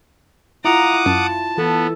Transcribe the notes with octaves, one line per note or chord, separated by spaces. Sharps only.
E4 F4 F#5 A#5 D6 D#6
F#2 A5
E3 B3 A4